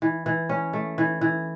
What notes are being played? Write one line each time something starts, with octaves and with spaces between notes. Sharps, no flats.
E3
E3
C#4
A3
E3
E3